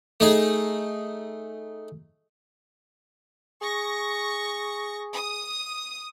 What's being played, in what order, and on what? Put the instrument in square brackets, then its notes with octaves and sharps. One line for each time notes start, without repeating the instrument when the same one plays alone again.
[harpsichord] A3 D#4 G#4
[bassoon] G#4 [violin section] C#6 A#6
[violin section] D#6